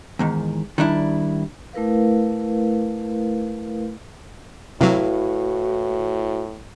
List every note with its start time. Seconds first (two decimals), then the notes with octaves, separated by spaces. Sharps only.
0.19 E2 G#2 D#3
0.78 D#3 G3 D4 E4
1.73 A3 E4 A#4 B4 F5
4.81 A2 C3 F#3 E4 F#4 B4 F5